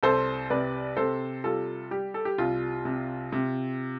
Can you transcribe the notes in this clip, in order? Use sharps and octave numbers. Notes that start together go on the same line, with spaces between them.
C2 A4 C5
C3 B4 D5
C3 A4 C5
G3 F4 A4
G3 G4
A4
G4
C2 F4
C3
C3